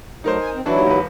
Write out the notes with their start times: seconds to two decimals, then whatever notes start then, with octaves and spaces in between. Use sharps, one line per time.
0.24 F#3 A3 D#4 A#4 C5
0.40 G#5
0.54 C4
0.66 D#2 E3 F#3 D4 E4 F#4
0.86 E1 B4